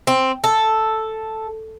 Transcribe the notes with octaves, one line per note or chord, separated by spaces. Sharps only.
C4
A4